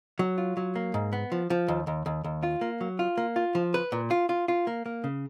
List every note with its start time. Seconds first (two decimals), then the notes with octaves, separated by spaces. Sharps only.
0.19 F#3
0.38 F4
0.57 F#3
0.76 A#3
0.94 G#2
1.13 B3
1.32 F3
1.50 F3
1.68 D#2
1.87 D#2
2.06 D#2
2.24 D#2
2.43 F4
2.61 A#3
2.81 F#3
2.99 F4
3.18 A#3
3.36 F4
3.55 F3
3.74 B4
3.92 A#2
4.11 F4
4.29 F4
4.48 F4
4.67 A#3
4.86 A#3
5.04 C#3